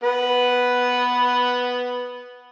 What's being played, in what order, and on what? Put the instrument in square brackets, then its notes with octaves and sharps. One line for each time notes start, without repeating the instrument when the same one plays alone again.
[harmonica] B3 B4